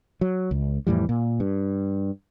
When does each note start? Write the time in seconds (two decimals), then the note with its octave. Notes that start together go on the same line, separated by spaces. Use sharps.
0.21 F#3
0.51 C#2
0.87 F2 A2 E3 G3
1.09 A#2
1.40 G2